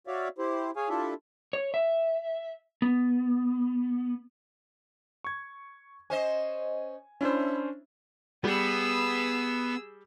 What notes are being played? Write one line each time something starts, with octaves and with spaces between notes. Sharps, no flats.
F#4 C#5 D5 E5 F5
E4 G4 C5
G#4 C#5 F5 G#5
D4 E4 F4 G4 A4 E5
C#5
E5
B3
C#6 G#6
C#4 C5 D#5 G#5
C#4 D4 E4 C5
G3 B3 G#4 E6